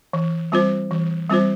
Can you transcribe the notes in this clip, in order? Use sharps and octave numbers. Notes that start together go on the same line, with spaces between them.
E3
G3 C4 F4 C5
E3
G3 C4 F4 C5